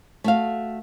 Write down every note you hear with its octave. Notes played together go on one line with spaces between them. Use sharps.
A3 F#4 F5